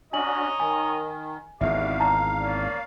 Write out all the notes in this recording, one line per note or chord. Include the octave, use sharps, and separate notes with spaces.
C#4 D4 F#4 C#5 D#5 G#5 A#5 F#7
D#3 G#5
G#1 E2 G#2 G3 F#4 E5 F5 D6
A5 A#5
A#3 C#4 D5